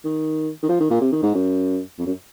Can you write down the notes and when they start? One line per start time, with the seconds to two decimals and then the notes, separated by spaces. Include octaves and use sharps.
0.05 D#3
0.63 D#3
0.69 F3
0.80 D#3
0.90 A#2
1.01 C3
1.12 D#3
1.23 G#2
1.35 F#2
1.99 F2
2.06 F#2